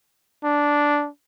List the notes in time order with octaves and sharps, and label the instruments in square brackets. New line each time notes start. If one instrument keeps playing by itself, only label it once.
[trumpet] D4